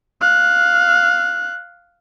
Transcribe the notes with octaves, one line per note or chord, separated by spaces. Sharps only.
F5 F#6